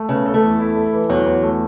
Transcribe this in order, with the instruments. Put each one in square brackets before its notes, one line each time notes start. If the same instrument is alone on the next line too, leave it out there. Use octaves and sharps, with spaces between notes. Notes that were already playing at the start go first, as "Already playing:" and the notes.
Already playing: [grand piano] A3
[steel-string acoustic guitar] C#3 [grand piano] B3
[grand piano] A4
[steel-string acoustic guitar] A3
[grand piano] E2
E4
A4
E3
[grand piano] E2 [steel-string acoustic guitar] F#3
[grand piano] E2
A3